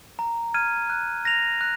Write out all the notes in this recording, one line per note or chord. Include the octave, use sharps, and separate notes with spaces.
A#5
F6 G#6 D#7
F#6
A#6 F7
F#6